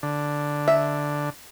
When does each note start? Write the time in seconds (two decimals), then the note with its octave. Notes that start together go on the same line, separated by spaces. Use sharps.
0.03 D3
0.68 E5